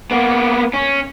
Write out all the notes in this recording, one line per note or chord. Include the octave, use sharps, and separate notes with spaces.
A#3 B3
C#4